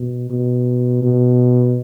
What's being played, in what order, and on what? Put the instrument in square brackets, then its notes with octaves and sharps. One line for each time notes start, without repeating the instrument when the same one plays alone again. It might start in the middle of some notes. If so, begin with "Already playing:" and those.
Already playing: [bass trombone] B2
B2
B2